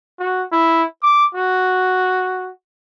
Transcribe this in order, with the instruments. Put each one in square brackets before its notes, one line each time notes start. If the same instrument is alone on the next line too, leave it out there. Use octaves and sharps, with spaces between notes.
[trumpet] F#4
E4
D6
F#4